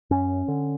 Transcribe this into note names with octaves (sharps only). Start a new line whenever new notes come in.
F#2 C#4
D3